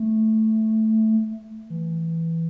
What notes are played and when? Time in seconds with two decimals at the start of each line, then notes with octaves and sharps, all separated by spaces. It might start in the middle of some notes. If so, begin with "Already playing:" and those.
Already playing: A3
1.70 E3